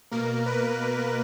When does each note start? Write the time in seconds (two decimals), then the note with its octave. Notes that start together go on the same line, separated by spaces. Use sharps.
0.12 B2 A#3 A#4
0.46 B4